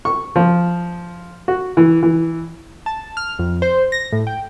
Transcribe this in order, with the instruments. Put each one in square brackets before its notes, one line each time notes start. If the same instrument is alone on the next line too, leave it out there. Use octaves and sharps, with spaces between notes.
[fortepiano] C#6
F3
F#4
E3
E3
[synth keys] A5
F6
F2
C5
A#6
A2
G5